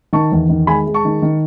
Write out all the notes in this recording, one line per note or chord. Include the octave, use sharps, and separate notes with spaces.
D#3 A5 C#6
E2
D#3
G#3 G#5 B5
G#3
A5 C#6
D#3
D#3